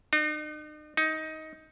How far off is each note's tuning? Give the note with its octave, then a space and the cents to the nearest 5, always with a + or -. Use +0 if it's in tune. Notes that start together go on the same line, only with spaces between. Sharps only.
D#4 -45
D#4 +15